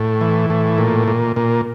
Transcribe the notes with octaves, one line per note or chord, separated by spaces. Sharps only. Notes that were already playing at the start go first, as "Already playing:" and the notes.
Already playing: A2
E3
A2
A#2
A#2
A#2